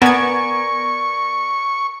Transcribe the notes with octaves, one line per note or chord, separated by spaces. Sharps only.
B3 A#4 D5 F#5 G#5 C#6 G#6